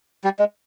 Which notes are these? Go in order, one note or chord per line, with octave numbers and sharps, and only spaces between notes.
G3
G#3